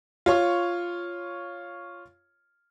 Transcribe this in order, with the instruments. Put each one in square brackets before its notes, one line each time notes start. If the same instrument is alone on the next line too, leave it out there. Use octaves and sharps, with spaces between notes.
[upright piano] F4 C#5 C#6